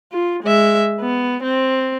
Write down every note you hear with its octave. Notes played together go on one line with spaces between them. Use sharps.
F4
G#3 E5
B3
C4